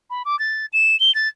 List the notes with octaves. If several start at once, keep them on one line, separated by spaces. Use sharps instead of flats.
B5
D6
A6
E7
G7
A6